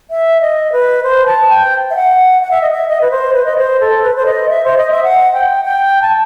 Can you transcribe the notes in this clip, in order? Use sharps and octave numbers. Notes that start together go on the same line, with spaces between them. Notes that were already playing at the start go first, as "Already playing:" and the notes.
E5
D#5
B4
C5
A5
G5
E5
F#5
F#5
E5
D#5
E5
D#5
B4
C5
B4
D#5
C5
A4
B4
C5
D#5
E5
C5
D#5
E5
F#5
G5
G5
A5